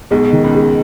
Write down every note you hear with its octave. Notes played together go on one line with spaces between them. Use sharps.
B1 B2 G#3
D#3
C#2 C#3
G#3